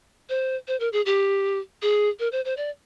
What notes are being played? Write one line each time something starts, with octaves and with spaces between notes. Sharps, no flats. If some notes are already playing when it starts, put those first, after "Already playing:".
C5
C5
A#4
G#4
G4
G#4
A#4
C5
C5
D5